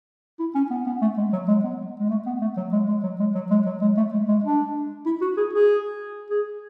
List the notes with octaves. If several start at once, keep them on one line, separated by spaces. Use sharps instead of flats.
E4
C#4
B3
B3
A3
G#3
F#3
G#3
B3
G#3
A3
B3
A3
F#3
G#3
G#3
F#3
G#3
F#3
G#3
F#3
G#3
A3
G#3
G#3
D4
E4
F#4
G#4
G#4
G#4